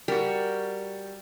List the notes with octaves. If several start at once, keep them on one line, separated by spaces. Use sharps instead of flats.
G3 F#4 A#4